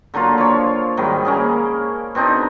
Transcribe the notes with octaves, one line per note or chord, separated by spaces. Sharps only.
D3 F#3 A#3 F4
F3 C#5
G#2 D#3 F#3 G3
A#3 C#4 G#4
B2 C4 D4 D#4